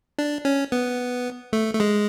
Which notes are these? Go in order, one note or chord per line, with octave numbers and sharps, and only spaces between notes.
D4
C#4
B3
A3
A3
G#3